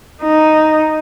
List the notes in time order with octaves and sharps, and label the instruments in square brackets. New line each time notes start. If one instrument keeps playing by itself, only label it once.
[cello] D#4